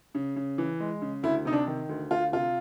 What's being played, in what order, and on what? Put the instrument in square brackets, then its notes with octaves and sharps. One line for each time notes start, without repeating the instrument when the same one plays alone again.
[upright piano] C#3
C#3
E3
G#3
C#3
[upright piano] D2 [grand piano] E4
[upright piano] C3 [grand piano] D#4
[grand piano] D4
[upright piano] D#3
D2
[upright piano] D2 [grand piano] F4
[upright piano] C3 [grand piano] F4